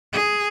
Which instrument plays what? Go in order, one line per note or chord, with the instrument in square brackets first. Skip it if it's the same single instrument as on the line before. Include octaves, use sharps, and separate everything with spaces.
[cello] G#4